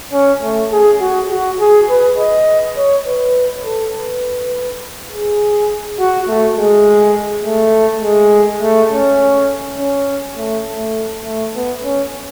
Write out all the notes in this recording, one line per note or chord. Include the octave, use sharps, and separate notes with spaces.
C#4
A3
G#4
F#4
F#4
G#4
B4
D#5
C#5
B4
A4
B4
G#4
F#4
A3
G#3
A3
G#3
A3
C#4
C#4
A3
A3
A3
B3
C#4